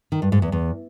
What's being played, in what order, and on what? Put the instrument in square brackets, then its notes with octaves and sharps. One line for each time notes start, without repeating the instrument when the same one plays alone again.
[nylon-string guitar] D#3
G2
G#2
E2
E2